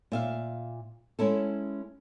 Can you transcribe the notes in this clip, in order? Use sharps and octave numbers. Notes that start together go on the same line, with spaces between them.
A#2 E5 F5
G#3 C#4 E4 A4